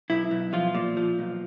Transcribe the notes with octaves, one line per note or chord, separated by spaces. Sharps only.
B1 E4
B1
F3 F4
A#2
F3
B1